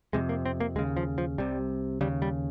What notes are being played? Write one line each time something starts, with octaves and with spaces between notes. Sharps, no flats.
F2 C3 G#3
A#3
C4
A#3
D#2 C#3 G#3
F3
F3
C2 C3 G3
D#2 C#3 G3
G3